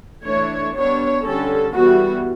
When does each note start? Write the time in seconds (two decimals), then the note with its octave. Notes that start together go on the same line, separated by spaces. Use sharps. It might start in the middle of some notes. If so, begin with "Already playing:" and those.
0.25 E3 A3 D4 C#5
0.76 G3 B3 D4 C#5
1.25 D3 G3 C#4 A4
1.74 E3 G3 B3 F#4